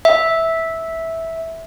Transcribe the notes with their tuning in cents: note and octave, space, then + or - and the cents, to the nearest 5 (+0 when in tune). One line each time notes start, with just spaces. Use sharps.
E5 -10